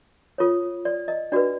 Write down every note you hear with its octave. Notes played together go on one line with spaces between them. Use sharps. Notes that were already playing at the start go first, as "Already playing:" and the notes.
F4 A4 C#5
D5
D#5
D4 F#4 B4 D5